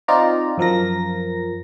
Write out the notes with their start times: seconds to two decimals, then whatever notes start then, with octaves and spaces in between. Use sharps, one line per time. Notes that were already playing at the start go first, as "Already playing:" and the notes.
0.08 C4 D#4 F4 D5 A#5
0.58 F#2 F3 A#4 A#6